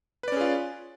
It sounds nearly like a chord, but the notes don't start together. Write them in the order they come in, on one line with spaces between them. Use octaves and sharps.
B4 D5 C#4 G#4 F4